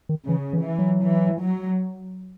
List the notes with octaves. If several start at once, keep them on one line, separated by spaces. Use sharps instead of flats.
D#3
C#3 E3
E3
E3
F#3
E3
F#3